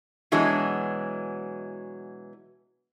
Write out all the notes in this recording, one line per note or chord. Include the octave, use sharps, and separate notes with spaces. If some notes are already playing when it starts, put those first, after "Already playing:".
B2 E3 F#3 G#3 D4